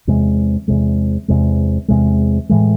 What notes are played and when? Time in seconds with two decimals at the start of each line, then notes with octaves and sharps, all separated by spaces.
0.07 E2 C3 G#3
0.68 E2 C3 G#3
1.28 E2 C3 G#3
1.88 E2 C3 G#3
2.49 A2 E3 G#3